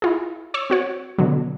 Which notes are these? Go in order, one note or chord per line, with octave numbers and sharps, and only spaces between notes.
E4 F4 G#4
C#5 C#6 E6
C4 F#4 C#5
B2 D3 F#3